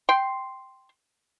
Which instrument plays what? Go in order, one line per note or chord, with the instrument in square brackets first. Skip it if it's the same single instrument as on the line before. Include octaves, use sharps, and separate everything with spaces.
[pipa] G5 C6